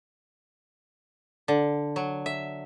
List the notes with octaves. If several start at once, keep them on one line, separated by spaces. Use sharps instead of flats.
D3
F#3
E5